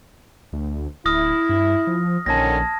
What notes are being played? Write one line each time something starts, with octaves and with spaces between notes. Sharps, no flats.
D2
D1 E4 D#6 F6 A#6
G2
F3
A#1 D3 D#3 C#4 A5 G#6 A#6